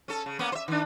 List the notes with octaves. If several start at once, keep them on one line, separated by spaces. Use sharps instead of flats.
C#4 A4
C#3
A#3 B3 C#4
C5 E5
D#3 D4